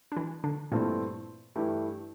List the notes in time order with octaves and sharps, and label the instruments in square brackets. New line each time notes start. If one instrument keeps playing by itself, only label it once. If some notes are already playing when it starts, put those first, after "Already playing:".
[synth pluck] D4
E3 E4
D3 D4
[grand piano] G2 E3 A3 C4 E4 [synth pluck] A#2 A#3
[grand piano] G2 E3 A3 E4 G4